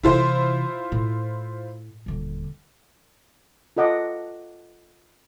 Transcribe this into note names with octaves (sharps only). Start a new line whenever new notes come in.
C3 E3 E4 F4 C5
A2
D#1 D3
F4 A4 D#5 F#5 D6